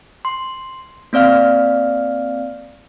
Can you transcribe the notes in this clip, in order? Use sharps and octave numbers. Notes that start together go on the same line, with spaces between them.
C6
A#3 C4 D5 F5 F6